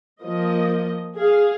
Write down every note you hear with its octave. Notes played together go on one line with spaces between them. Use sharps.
F3 A#3 D#5
G#4 F5